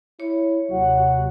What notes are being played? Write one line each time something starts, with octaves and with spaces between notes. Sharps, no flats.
E4 C#5
D#2 C3 F#3 F#4 F#5